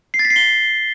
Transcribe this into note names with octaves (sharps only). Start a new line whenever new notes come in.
C7
A6
B6
C7
G7